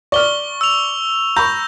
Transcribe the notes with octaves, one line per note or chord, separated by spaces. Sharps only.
D5 C#6 F6 G7
E6 F7
A#5 B5 C#6 G6 A#6